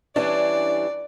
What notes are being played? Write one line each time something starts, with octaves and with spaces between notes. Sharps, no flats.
E3 G3 C#4 D4 D5